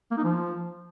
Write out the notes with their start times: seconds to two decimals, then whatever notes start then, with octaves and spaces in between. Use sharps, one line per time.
0.11 A#3
0.18 D#4
0.24 F3